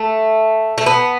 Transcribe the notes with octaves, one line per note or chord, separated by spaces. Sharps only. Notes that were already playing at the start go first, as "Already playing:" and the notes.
Already playing: A3
A3
B3